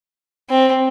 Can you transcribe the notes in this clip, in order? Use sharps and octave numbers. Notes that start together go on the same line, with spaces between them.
C4